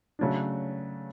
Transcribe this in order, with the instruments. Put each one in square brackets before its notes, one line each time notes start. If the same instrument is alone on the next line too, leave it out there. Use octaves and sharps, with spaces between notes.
[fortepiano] C#3 F#3 A3 D4